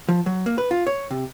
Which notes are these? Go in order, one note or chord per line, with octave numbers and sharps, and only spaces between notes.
F3
F#3
A#3
B4
F4
C#5
C3